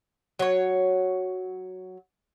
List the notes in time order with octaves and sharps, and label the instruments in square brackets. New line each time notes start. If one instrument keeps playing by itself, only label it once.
[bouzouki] F#3 C#5